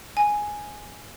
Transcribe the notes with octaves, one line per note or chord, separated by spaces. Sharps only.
G#5